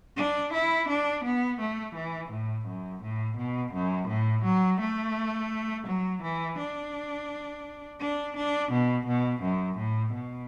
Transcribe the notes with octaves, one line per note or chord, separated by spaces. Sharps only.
D4
E4
D4
B3
A3
E3
A2
F#2
A2
B2
F#2
A2
F#3
A3
F#3
E3
D4
D4
D4
B2
B2
F#2
A2
B2